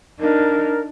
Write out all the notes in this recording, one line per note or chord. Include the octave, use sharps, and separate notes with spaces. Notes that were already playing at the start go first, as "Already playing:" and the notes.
D4 D#4 A#4